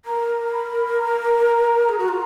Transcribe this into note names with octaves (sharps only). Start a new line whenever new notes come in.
A#4 A#5
B5
A#5
G#4
F#4
F4